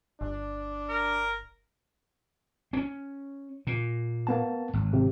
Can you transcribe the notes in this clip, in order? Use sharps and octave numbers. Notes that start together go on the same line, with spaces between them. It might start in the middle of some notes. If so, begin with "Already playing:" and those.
G1 D4
A#4
C4 C#4
A#2
A#3 B3 A5
G#1
C3